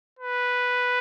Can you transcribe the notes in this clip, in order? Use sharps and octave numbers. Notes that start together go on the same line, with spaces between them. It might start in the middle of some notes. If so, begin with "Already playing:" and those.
B4